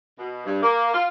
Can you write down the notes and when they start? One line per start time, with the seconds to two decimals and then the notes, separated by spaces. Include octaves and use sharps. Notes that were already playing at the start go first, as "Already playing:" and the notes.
0.18 B2
0.46 G2
0.62 A#3
0.93 F4